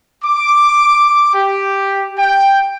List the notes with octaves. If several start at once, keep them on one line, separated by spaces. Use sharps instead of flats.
D6
G4
G5